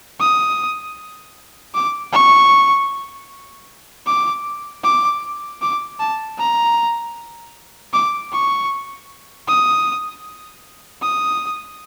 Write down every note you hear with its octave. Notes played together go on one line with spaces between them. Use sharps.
D#6
D6
C#6
D6
D6
D6
A5
A#5
D6
C#6
D#6
D#6